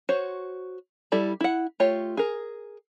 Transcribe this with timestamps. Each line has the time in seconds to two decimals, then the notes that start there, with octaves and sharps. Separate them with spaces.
0.09 F#4 C5 C#5
1.12 G3 E4 A4 D5
1.41 E4 F#5
1.80 A3 F4 G4 C#5
2.17 G#4 A#4